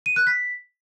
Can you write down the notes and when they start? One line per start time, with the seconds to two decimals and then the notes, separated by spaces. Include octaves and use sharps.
0.06 D#7
0.16 F#6
0.27 B6